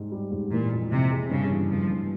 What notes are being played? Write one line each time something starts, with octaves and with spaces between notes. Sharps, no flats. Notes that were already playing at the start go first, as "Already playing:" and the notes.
Already playing: G#2 G3
G3
G#2
A#2 E3
F2
F2 C3
G#3
G2 C#3
E3
G2 F3
G2